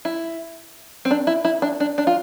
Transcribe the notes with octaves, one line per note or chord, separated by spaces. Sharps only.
E4
C4
D4
E4
E4
D4
D4
D4
F4